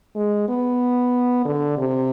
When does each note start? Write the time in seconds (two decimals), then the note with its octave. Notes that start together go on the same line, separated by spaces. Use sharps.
0.16 G#3
0.49 B3
1.45 D3
1.78 C3